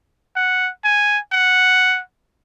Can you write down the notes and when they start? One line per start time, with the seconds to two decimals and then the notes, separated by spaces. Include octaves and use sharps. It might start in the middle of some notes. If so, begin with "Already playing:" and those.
0.36 F#5
0.84 G#5
1.32 F#5